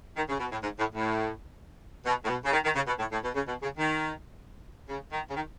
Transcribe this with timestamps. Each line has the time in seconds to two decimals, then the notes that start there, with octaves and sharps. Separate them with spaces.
0.16 D#3
0.29 C#3
0.40 B2
0.52 A2
0.63 G#2
0.79 A2
0.95 A2
2.06 B2
2.25 A2
2.28 B2
2.45 C#3
2.52 D#3
2.64 D#3
2.76 C#3
2.87 B2
2.99 A2
3.12 A2
3.23 B2
3.35 C#3
3.47 B2
3.62 C#3
3.78 D#3
4.89 C#3
5.12 D#3
5.30 C#3
5.35 D#3